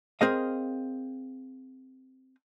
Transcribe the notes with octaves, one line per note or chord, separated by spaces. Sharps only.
C4 G#4 A#4 D#5 F5